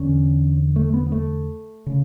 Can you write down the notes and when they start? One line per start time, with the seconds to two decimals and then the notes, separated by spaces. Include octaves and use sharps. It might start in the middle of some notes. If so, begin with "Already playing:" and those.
Already playing: E2 D3 C#4
0.76 A3
0.94 B3
1.07 B3
1.12 A3
1.86 C#3